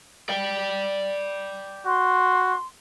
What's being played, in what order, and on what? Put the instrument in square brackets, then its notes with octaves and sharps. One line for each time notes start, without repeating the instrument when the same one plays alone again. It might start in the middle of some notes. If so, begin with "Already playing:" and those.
[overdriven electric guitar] D5 G5
[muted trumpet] F#4 [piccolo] C6